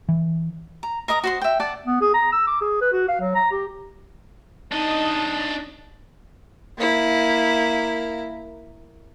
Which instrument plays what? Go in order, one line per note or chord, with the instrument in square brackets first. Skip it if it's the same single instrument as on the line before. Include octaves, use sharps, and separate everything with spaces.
[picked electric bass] E3
[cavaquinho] A#5
A#4 D#5 A#5 D#6
F#4 C5 C6
E5 G5
D5 F#5 A5
[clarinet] B3
G#4
A#5
E6
D6
G#4
B4
F#4
F5
F#3
A#5
G4
[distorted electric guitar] D4 D#5 [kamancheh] D#4 A5
[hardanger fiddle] A#3 E4